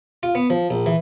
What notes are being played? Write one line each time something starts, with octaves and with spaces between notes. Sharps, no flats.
F4
B3
F3
A#1
E3